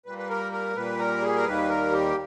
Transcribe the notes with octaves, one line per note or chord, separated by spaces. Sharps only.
A#2 G3 A#3 B4
B4
A#4
A#4
A#2 G3 A#3 B4
A#4
G#4
A#4
D#2 D#3 G3 A#3 B4
A#4
G4